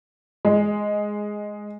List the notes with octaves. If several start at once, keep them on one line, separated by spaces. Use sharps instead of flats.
G#3